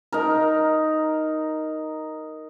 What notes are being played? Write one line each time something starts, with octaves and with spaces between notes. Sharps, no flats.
D#4 A#4